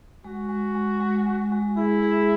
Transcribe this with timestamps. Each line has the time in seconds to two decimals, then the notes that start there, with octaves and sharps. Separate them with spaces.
0.25 G#3 F#4
0.49 G#3
0.75 G#3
1.00 G#3
1.26 G#3
1.52 G#3
1.77 E4 G#4
2.03 G#4